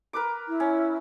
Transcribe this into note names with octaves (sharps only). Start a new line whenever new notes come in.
A#4 B4 D6
E4
C#4